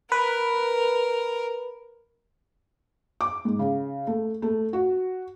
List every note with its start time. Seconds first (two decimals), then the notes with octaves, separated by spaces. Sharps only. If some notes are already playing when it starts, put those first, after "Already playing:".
0.12 A#4 B4
3.21 D6
3.45 G#2
3.59 C#3
4.07 A3
4.42 A3
4.73 F#4